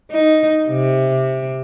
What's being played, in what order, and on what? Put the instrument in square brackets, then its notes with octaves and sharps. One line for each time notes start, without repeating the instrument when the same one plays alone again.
[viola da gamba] D#4
C3